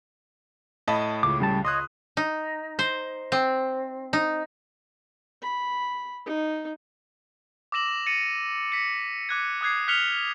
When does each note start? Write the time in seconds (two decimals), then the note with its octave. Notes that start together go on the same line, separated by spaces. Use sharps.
0.88 A2 D#5 A5 B5
1.23 C#2 D6
1.40 C#3 G3 A5
1.65 C#5 D#5 C6 D#6 F#6
2.17 D#4
2.79 C5
3.32 C4
4.13 D#4
5.42 B5
6.26 D#4
7.72 D6 E6 A#6 E7 F#7
8.06 A6 A#6 C#7 D#7
8.72 A#6 B6 C#7
9.29 D6 F#6 G#6
9.61 D6 D#6 F#6 G#6 C7
9.88 F6 F#6 B6 C#7 F7 G7